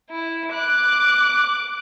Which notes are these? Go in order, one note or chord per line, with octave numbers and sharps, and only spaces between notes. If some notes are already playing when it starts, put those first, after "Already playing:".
E4
D6 F#6